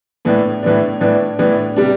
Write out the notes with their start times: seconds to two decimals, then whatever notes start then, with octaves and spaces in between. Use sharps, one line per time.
0.25 A2 E3 B3 D4
0.63 A2 E3 B3 D4
1.01 A2 E3 B3 D4
1.39 A2 E3 B3 D4
1.77 C3 G3 D4